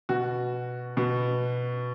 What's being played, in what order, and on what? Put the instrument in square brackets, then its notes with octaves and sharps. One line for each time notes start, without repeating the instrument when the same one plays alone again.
[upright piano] B2 F#4
B2